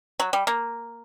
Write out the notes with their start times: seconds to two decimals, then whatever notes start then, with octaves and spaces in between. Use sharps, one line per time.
0.20 F#3
0.33 G3
0.47 A#3